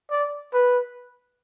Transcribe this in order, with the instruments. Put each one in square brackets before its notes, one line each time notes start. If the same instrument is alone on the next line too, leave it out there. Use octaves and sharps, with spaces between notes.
[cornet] D5
B4